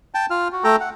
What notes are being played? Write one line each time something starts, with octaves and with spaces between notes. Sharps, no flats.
G5 A5
F4 F6
F#4
A3 A4 G5 A#5
F#5